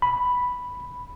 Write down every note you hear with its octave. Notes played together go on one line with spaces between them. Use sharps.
B5